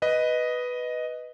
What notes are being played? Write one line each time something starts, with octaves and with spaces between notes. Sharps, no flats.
B4 D#5